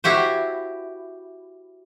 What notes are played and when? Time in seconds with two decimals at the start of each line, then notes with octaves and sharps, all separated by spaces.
0.04 E4 F#4 G4 C5